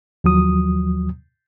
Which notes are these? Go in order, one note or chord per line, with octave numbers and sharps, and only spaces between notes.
D#2 F3 F#3 D#6